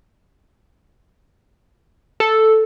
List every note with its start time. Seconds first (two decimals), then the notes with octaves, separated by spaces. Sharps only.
2.20 A4